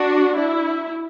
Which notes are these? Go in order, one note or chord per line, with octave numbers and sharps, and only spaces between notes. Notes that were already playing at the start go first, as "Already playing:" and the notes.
Already playing: D4 F#4
E4